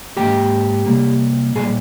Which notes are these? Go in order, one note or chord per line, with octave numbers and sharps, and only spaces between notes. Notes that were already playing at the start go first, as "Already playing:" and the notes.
G#2 F3 A#3 G4 G5
C3 G3 A#3
A#2 G3 A#3 G#4 G#5